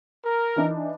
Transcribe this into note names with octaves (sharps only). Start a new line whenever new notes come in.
A#4
E3 D4 D#4